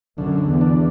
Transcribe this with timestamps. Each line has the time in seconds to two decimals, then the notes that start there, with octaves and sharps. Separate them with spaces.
0.18 F#2 D3
0.47 E2
0.61 D4